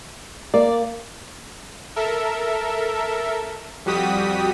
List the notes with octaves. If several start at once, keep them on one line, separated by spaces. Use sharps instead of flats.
A#3 D5
A4 A#4 E5
F2 G3 F#4 G4 D#6 B6